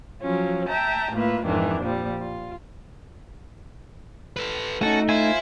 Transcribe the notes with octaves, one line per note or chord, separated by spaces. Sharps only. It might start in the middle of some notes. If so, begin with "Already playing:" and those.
F3 F#3 C#4 F4
E5 G5 A5 A#5
A2 A#3 F4 B4 E5
F2 G#2 D#3 E3 D4
A#2 F3 G3
F4
A4 B4
A3 C#4 D#4 F#4 A4
E4 F4 C5 G#5